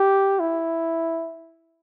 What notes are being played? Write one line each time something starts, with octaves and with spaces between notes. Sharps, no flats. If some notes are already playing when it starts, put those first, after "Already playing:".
Already playing: G4
E4